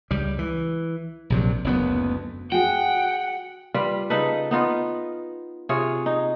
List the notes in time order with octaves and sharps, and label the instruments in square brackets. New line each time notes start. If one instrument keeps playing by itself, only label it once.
[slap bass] C#2 G3
E3
A#1 C3 F#3
F#1 D2 B3
[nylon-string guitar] F#4 G#4 [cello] F#5 [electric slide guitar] G5
[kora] G3 F4 B4
C#3 D#4 A4 B4
B3 D#4 F4
C3 F4 G#4 C#5
D#4